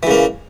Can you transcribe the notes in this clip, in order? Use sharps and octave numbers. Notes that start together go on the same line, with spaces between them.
C#3 E3 A#3